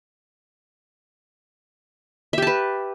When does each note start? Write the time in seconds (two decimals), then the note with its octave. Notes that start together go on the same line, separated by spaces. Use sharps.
2.33 E5
2.38 G4
2.42 A5
2.47 B4